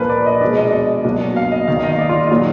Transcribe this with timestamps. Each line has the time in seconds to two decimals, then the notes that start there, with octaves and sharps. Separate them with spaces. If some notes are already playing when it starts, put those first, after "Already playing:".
Already playing: A#2 F3 A#3 D4 A#4 B4
0.10 D5
0.26 D#5
0.41 B2 G#3 D4 D5
0.57 D#5
0.73 D#5
1.04 B2 F#3 A#3 D4
1.36 F5
1.51 D#5
1.68 D#3 A#3 D#4 F5
1.83 D#5
1.99 D5
2.09 F4
2.31 A#2 F#3 A#3 D#4